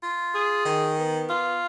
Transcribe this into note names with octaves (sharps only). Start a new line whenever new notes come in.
F4
G#4
D#3
B3
F4